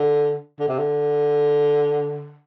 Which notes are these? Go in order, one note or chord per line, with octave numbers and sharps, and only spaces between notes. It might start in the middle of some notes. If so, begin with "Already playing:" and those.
Already playing: D3
D3
C3
D3